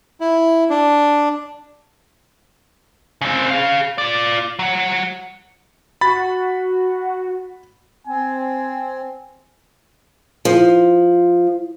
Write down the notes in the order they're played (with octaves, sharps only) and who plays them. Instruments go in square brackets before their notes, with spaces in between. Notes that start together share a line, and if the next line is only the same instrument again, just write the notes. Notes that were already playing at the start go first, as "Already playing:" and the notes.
[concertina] E4
D4
[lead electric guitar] C#3 C4
G#4 F5
F4 D5
F#3 F#5
[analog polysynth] F#4 [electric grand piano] B5 A6
[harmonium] C4 [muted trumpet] G#5
[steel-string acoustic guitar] F3